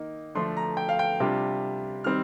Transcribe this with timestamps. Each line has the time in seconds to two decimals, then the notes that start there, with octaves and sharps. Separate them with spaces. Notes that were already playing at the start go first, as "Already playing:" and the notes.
Already playing: D#3 A#3 D#4
0.35 D3 F3 A3 D4 C6
0.57 A#5
0.77 G5
0.89 F5
0.99 G5
1.20 C3 G3 D4 F4
2.04 D#3 G3 C4 F6